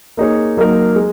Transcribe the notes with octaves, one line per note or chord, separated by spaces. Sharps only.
A#3 D#4 G#4 C#5
F#3 A#3 D#4 A#4
G#3